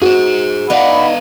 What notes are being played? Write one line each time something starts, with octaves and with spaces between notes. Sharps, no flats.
F#4 G#4 C5
B3 D#4 D5 F5 F#5 B5